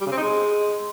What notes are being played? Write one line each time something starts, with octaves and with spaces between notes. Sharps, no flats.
G3
C#3
C4
D#4
G#3